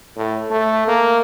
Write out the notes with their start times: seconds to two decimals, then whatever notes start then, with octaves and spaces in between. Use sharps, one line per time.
0.17 A2
0.51 A3
0.88 A#3